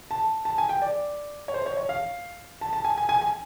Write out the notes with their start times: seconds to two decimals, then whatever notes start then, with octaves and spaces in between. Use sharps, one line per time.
0.11 A5
0.45 A5
0.58 G#5
0.69 G5
0.82 D5
1.48 C#5
1.54 C5
1.66 C#5
1.77 C#5
1.89 F5
2.61 A5
2.73 A5
2.85 G#5
2.98 G#5
3.09 G#5
3.22 G#5